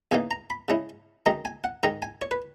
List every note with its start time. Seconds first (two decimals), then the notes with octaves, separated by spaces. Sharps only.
0.11 E2 C#3 E3 A#3 D#4 G#5
0.31 A#5
0.50 B5
0.68 C#3 G#3 C#4 E4
1.26 F#2 D#3 G#3 D#4 A#5
1.45 G#5
1.64 F#5
1.83 G#2 D#3 G#3 A#5
2.02 G#5
2.22 C#5
2.31 B4